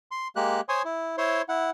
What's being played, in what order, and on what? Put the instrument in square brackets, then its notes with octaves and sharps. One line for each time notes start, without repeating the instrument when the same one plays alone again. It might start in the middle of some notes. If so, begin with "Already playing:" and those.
[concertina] C6
G#3 A#3 G4 F#6
C5 C#5 G#5 C6 D#6
E4
E4 C5 C#5 C6
E4 F#5